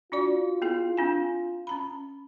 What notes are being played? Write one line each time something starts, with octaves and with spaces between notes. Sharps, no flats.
D4 F4 F#4 D5
B3 E4 G#4
C4 D4 G#5
C#4 A#5 B5